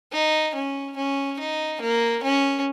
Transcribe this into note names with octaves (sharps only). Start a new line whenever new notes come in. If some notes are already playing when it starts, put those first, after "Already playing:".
D#4
C#4
C#4
D#4
A#3
C#4